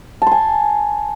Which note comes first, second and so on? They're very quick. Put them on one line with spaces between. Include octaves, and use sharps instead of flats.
A5 C6 G#5